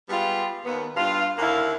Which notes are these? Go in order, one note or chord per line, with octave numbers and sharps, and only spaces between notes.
G3 G#3 B3 F4 G4
D#2 B3
G2 F4
D#2 D3 A#3 E4 F5